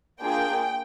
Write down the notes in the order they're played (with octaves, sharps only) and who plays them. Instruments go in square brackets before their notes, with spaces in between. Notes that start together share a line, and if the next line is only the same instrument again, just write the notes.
[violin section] A#3 D4 F4 G#4 G5